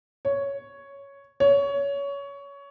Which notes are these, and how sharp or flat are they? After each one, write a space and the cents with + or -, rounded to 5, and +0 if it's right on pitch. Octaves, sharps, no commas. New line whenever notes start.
C#5 +5
C#5 +20